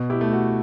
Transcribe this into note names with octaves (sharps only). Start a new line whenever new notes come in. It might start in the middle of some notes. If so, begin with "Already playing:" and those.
Already playing: B2
E4 G4
A3
F#4